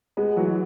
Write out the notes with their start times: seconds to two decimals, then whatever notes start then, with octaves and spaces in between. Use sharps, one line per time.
0.17 G#3 B3
0.37 E3 F#3